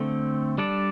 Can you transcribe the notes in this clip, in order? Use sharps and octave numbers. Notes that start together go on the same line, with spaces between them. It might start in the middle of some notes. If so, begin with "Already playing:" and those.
Already playing: D3 A3 C4
G3 D4 A4 D5